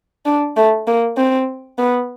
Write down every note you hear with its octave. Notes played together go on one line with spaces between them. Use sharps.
D4
A3
A#3
C4
B3